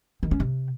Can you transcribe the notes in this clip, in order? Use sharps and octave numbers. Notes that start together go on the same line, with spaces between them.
D#3
C#4
C3